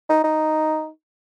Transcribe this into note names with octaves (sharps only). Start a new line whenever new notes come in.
D#4
D#4